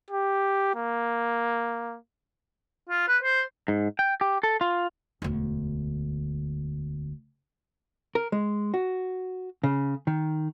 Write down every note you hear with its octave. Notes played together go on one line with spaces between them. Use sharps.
G4
A#3
F4
B4
C5
G#2
G5
G4
A4
F4
E1 D2
A#4
G#3
F#4
C#3
D#3